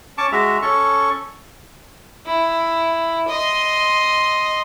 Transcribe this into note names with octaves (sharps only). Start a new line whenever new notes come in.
C#4 A5 C#6 D6
G#3 F#4 E5 A#5
C#4 A4 C#6
E4
D#5 C6